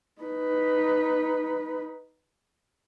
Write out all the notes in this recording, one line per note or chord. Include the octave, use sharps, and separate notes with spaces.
D#4 B4